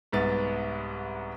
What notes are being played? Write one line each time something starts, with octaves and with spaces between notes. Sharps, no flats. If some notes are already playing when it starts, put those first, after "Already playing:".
C2 G#2 B3 A6